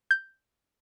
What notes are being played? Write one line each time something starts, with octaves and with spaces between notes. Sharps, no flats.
G6